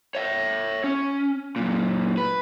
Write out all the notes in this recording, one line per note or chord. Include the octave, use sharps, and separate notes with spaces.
C#5 E5
C#4
F#2 A#2
B4